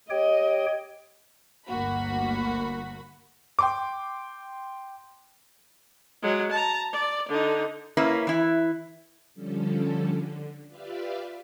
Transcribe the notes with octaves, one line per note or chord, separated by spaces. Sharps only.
G4 C#5 D#5 G5
G1 D2 A#3 F#4 B5
G5 C6 D6
F#3 G#3
A5 A#5
D5
D3 D#4
A#3 C#4 E4 B4
E3 E4
D3 F3 G3 C#4 A4
D3
F4 G4 B4 D5 E5 F5